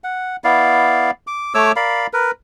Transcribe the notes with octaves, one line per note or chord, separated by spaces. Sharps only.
F#5
B3 E4 D5 F5
D6
A3 C#5 D6 E6
A#4 D5 F5 B5
A#4 B4